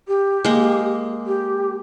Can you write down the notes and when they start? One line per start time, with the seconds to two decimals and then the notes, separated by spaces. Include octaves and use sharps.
0.08 G4
0.44 G#3 A#3
1.27 G4